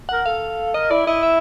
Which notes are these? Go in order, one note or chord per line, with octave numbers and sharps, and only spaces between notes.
A#4 F#5
A4 F5
A#4 D#5
E4 D5
E4 D#5
E5